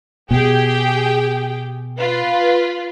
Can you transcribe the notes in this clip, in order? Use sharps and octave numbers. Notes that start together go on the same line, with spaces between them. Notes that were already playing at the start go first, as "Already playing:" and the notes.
B2 G4 G#4 G5
F4 B4